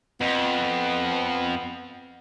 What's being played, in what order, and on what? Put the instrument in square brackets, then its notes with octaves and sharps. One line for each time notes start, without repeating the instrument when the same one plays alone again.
[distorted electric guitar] F2 [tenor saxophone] B3